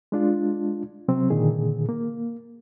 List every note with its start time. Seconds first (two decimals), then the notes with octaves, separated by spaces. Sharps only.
0.12 G#3 D4 F4
1.08 C3 F#3 C4
1.30 A#2 D3 D#3 G#4
1.89 A#3